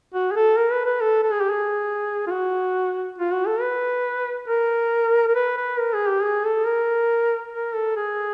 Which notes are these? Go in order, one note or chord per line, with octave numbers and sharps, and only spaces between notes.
F#4
G#4
A4
A#4
B4
B4
A4
A4
G#4
G4
G#4
F4
F#4
F4
F#4
A4
B4
A#4
A#4
B4
B4
A#4
G#4
G4
G#4
A4
A#4
A#4
A4
G#4